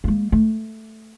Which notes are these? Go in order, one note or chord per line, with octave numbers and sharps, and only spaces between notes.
G#3 A#3
A3